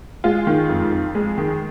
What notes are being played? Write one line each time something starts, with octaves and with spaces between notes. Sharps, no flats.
G#3 F4
D#3
F2
F2
G#3
D#3